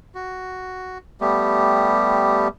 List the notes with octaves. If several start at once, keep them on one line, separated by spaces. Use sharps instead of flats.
F#4
G3 A3 B3 G4